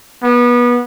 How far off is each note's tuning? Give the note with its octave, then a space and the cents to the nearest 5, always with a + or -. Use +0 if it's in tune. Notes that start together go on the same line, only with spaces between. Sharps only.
B3 -25